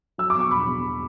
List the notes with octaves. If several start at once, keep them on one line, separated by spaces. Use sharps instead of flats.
F#3 E6
D6
B2 C#6
E1 B5 D6
E2